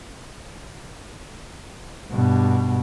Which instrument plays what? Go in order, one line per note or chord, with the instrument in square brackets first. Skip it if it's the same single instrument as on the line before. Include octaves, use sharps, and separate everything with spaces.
[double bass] G2 B2